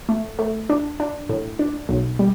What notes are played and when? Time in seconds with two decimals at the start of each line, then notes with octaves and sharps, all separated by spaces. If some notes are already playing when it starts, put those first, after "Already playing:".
0.09 A3
0.39 A3
0.69 D4
1.00 D4
1.29 A2
1.59 D4
1.89 B1
2.19 G3